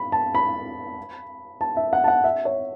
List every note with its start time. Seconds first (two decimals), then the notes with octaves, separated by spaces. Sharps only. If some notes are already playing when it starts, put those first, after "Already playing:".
Already playing: B5
0.12 A5
0.35 B5
1.61 A5
1.77 E5
1.93 F#5
2.04 A5
2.08 F#5
2.24 E5
2.45 C#5